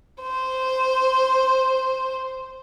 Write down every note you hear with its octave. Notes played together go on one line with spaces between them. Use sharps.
C5